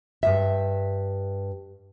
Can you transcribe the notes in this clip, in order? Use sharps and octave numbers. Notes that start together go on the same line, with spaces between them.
G2 C3 E5